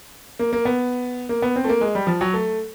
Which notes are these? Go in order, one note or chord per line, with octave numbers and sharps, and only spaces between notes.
A#3
A#3
B3
A#3
B3
C4
A3
A#3
G#3
G3
F3
F#3
A3